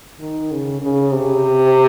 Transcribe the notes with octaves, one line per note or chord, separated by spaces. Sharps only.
D#3
C#3
C#3
C3